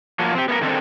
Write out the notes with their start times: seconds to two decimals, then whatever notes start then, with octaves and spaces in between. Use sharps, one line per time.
0.19 F3 F#3 A#3
0.35 C4 G4
0.49 B3 G#4 A#4
0.61 D3 D#3 G#3 C4 A4 C5